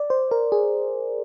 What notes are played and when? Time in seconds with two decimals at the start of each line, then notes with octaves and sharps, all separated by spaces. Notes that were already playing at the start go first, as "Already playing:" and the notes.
Already playing: D5
0.10 C5
0.31 A#4
0.52 G#4